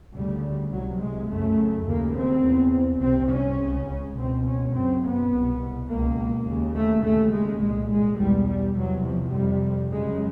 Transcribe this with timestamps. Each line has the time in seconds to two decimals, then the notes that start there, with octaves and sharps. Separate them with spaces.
0.15 D2 C#3 G3
0.72 C2 C3 F#3
1.01 G#3
1.30 F#2 C#3 A3
1.87 D#2 C#3 A#3
2.16 C4
2.45 E2 C#3
3.02 C2 C3 C4
3.31 C#4
3.60 C#2 C#3
4.17 C#2 B2 C4
4.46 C#4
4.74 F#2 C#3 C4
5.03 B3
5.32 C2 B2
5.89 C#2 B2 A#3
6.47 D#2 C#3
6.76 A3
7.04 D#2 C#3 A3
7.33 G#3
7.62 C2 A#2 G#3
7.90 G#3
8.19 E2 B2 G3
8.47 G3
8.77 E2 C3 F#3
9.05 F3
9.34 F2 C3 G3
9.91 F#2 C#3 G#3